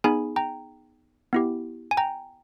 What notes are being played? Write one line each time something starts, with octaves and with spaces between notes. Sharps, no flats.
B3 D#4 G#4 G#5 B5
G5 A#5
B3 E4 G4
G#5
G5 A#5